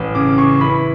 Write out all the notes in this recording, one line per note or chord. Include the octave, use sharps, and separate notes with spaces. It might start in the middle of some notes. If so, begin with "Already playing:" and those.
Already playing: A1
C#3 D6
C#3 C#6
E3 B5